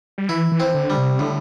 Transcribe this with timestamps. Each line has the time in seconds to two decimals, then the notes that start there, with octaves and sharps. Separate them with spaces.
0.18 G3
0.29 E3 E4
0.52 E3
0.60 C4
0.74 D3
0.90 G3
0.97 C3
1.19 A2 D3